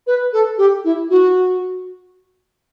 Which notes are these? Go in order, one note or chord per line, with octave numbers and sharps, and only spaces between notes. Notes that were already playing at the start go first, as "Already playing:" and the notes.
B4
A4
G4
E4
F#4